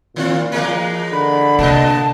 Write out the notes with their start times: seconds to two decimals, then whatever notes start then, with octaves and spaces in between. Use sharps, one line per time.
0.16 A#2 D#3 C4 F4
0.52 E3 G#3 A#3
1.13 D3 B5
1.59 A2 C3 D#5 A5